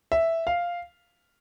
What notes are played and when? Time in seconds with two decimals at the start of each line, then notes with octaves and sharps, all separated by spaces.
0.12 E5
0.47 F5